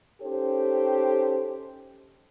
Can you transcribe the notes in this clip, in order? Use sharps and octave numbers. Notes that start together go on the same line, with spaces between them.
C#4 D#4 G4 A4 C5